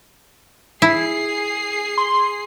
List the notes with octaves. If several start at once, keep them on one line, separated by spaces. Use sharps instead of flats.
E4 G#4 C7
C6